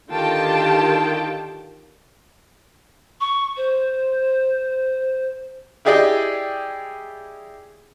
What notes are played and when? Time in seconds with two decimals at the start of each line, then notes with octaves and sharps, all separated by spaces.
0.10 D3 D#3 F4 G4 G5 A5
3.20 C#6
3.56 C5
5.85 E4 G4 G#4 D5 D#5 G5